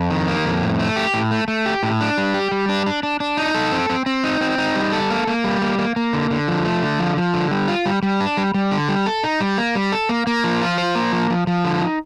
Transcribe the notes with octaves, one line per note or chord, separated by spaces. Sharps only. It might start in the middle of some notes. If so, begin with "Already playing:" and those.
Already playing: F2
D#3
A#3
F2
A2
A3
G4
A2
A3
A3
G4
A2
D4
G3
G4
G3
D4
D4
D4
D4
D#4
A4
C4
C4
C4
D#4
C4
D#4
G3
A4
A#3
A#3
G3
A#3
A#3
A#3
D3
D3
F3
A3
D3
F3
F3
D3
G3
F4
G3
G3
D4
G3
G3
D3
G3
A4
D#4
G3
A#3
G3
A4
A#3
A#3
F3
F4
C5
A#3
F3
F3
F3
D3
D#4